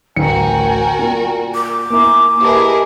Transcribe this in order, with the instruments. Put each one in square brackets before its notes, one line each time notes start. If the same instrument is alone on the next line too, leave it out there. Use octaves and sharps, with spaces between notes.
[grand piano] A1 D2 C#7 [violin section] F#4 A#4 [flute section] G5 G#5 A#5
[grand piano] A#2
[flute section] E5 [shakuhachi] D6
[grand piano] A#3 E4 [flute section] G#5 A#5
[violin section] E4 G#4 A#4 [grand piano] G4 A5 [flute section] B4 D#5